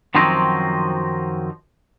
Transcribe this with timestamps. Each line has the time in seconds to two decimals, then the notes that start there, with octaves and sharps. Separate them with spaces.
0.15 F#2 D#3 F3 F#3 C4 D#4